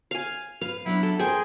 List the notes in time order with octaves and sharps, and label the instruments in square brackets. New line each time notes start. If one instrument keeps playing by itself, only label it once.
[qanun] F5 G#5
[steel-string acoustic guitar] B4 [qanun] F5
[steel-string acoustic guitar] F#3 B3 D4 [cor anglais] E4
[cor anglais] E4 [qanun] A4
[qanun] G#4 G#5 [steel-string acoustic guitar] A#4 C5 [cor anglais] G5